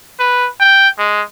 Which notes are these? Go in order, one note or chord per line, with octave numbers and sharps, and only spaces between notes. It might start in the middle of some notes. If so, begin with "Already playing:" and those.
B4
G5
G#3